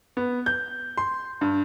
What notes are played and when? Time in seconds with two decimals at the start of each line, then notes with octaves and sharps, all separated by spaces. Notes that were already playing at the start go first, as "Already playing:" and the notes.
0.17 B3
0.46 G6
0.97 C6
1.41 G2